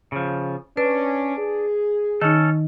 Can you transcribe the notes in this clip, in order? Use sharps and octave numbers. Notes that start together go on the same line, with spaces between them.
C#3 F3
C#4 D4 B4
G#4
D#3 C#4 D#4 A4